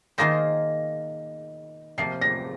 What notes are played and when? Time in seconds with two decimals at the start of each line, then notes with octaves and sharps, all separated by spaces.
0.18 D#3 A#3 F4 G#4 C5 A#6
1.98 C3 F3 A#3 C7
2.21 A#6